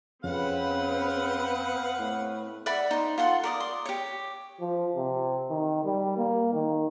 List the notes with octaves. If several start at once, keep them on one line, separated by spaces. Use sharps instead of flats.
F2 C#3 C4 B4 F5 F#5
A2
D5 E5 F#5 B5
D#4 C5
F4 A4 F#5 C6
A#4 D5 D#5
C6
G4 C#5
F3
C3
D#3
G3
A#3
D#3